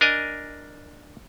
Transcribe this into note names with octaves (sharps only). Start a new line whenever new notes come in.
D4 A#4 D#5 G#5